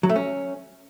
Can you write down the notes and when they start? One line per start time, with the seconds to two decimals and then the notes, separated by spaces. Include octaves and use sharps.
0.03 F#3
0.09 A3
0.16 C#4